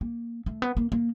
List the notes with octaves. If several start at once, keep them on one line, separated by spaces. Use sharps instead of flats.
A#3
A3
B3
A#3
A#3